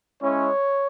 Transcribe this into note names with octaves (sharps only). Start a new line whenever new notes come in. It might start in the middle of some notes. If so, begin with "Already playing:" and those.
G#3 C#4 E4 C#5